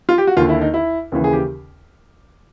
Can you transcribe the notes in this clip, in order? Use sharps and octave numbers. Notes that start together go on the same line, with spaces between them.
F4
G4
F#4
D#2 D3 F4
E4
D#4
E4
D#2 C#3 E3
G#4
G4